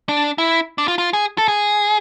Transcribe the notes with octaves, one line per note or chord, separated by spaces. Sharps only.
D4
E4
D4
F4
F4
G#4
A4
G#4